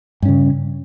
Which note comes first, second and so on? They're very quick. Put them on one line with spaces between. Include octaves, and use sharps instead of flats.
G2 C#4 C#3